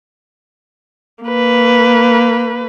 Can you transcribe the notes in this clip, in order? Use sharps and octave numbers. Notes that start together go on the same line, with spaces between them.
A#3 B4